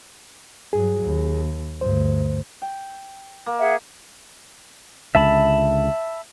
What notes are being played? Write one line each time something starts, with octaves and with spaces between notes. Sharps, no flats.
G2 F#3 G#4
D#2
D2 G2 C5
G5
A#3
G#4 E5 F#5
C#2 D3 E5 A5 B5